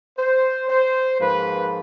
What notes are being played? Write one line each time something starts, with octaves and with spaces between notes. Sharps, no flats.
C5
C5
G#2 F3 A#3 B4